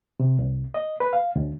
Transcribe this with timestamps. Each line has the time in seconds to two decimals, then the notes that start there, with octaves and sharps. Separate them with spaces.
0.20 C3
0.39 C2
0.74 D#5
1.00 B4
1.13 F5
1.36 D2